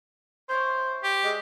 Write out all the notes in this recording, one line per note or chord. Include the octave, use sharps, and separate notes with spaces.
C#4 E4 C5 C#5
G4
G#3 D5 E5